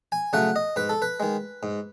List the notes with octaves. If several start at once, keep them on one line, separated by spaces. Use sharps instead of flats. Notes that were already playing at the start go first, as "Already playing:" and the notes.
G#5
C#3 F#3 A3 F#5
D#5
G#2 B4
A4
B4
D#3 G#3
G#2